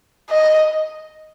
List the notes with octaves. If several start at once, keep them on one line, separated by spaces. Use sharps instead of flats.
D#5